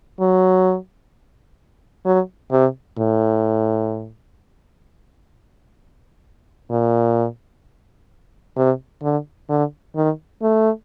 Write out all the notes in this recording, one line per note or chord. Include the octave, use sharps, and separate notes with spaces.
F#3
F#3
C3
A2
A#2
C3
D3
D3
D#3
A3